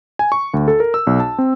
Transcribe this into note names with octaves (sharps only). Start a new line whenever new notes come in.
G#5
C#6
D2
A4
A#4
E6
B1
A5
C4